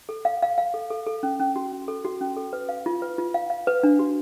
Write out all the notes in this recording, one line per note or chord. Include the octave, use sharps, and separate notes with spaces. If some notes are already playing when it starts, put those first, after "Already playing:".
A4
F5
F5
F5
A4
A4
A4
C#4
C#4
F#4
C#4
A4
F#4
C#4
A4
B4
F5
F4
B4
F4
F5
F5
B4
D4
F#4